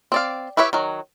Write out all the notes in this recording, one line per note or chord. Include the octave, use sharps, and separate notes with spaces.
C4 D5 F5
E4 G4 B4 C#5 E5
D#3 F#3